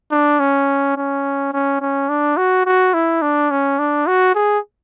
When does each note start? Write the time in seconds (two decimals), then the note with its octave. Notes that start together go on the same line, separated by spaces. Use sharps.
0.11 D4
0.40 C#4
0.97 C#4
1.53 C#4
1.81 C#4
2.09 D4
2.37 F#4
2.66 F#4
2.94 E4
3.22 D4
3.51 C#4
3.79 D4
4.07 F#4
4.35 G#4